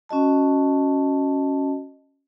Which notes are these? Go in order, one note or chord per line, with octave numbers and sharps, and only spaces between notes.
C#4 F#4 D#5 A5